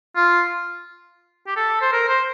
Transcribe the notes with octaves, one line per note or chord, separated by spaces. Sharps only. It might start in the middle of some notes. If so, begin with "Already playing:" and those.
F4
G4
A4
C5
A#4
C5